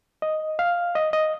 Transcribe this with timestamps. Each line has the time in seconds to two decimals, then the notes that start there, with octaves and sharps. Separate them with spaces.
0.22 D#5
0.59 F5
0.95 D#5
1.13 D#5